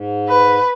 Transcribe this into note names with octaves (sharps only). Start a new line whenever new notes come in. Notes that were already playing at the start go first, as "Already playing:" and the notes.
Already playing: G#2
B4